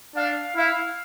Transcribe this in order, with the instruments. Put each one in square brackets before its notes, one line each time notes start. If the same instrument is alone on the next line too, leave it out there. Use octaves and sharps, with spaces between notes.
[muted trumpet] D4 [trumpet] F5
[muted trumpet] E4 [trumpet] F5